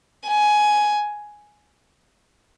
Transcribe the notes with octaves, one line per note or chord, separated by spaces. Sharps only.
G#5